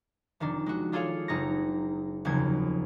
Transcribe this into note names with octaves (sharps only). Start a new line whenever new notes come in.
F1 D#3 D4
G#3 F#4
D4 F4 G#4 A4 C#5 F5
F#1 D#4 G#4 C#6 A#6
F1 D#2 C#3 F#3 G#6